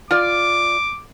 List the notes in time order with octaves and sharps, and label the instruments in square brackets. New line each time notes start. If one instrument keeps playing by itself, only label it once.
[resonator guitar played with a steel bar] F4 D5 [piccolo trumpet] D6